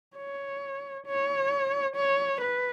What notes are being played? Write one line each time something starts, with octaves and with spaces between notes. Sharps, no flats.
C#5
C#5
C#5
B4